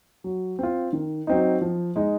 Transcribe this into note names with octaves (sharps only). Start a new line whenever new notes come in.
F#3
C4 F4
D#3
F#3 C4 D#4
F3
G#3 D#4